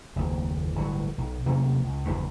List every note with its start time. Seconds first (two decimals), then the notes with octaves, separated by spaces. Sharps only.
0.16 F#1 D#2
0.75 G1 A2 F#3
1.18 B1
1.46 C3 F#3 A#3 C#4
1.84 C#2
2.05 F#1 E2 G2